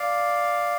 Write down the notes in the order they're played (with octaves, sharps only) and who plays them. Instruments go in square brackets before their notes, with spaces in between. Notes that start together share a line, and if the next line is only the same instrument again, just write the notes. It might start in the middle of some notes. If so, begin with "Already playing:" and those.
Already playing: [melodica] D5 F5